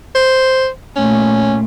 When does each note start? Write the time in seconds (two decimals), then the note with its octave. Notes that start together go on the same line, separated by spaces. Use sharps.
0.15 C5
0.96 A#2 A3 C#4